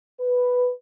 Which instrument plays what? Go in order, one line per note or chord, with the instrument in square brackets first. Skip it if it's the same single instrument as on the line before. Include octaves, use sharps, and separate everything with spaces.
[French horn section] B4